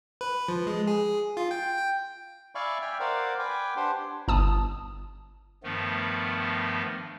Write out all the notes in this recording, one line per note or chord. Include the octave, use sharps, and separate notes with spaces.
B4
F3
G#3
G#4
F4
G5
G5
D5 E5 F5 G#5 B5 C#6
E5 G5 G#5 F6
A#4 C5 D5 F5 F#5
B4 G5 G#5 D6
D4 G4 C5 F#5 C6
G1 A5 D#6
G2 D#3 F3 A3 B3